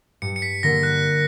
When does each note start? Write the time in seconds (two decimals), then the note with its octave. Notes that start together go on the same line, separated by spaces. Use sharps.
0.22 G2 C#7
0.36 C#7
0.42 B6
0.63 D3 A#3 A#6
0.83 F#6